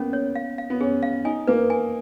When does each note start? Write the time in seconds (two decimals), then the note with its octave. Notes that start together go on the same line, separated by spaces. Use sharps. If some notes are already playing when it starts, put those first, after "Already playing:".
Already playing: A#3 B3 C#4
0.13 C#5
0.35 F5
0.58 F5
0.70 B3
0.80 C#4 G#4
1.03 F5
1.25 D#4 G#5
1.47 A#3 B4
1.70 G#5